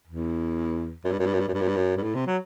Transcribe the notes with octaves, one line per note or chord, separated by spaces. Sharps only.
E2
F#2
G2
F#2
G2
F#2
G2
F#2
G2
F#2
G2
F#2
G2
A2
C3
F#3